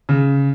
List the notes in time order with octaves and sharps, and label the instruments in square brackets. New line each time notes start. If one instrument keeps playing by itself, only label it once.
[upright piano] C#3